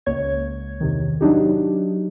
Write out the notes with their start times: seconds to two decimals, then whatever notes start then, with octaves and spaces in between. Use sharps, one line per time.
0.06 C#2 A#3 C#5 G#6
0.80 E2 C3 D#3
1.21 F#3 D4 D#4 G4